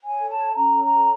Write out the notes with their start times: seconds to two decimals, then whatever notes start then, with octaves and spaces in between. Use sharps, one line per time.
0.03 C#5 G#5
0.20 A4
0.30 A5
0.38 A4
0.56 C#4 A#5
0.74 C#5
0.83 A#5
0.92 A4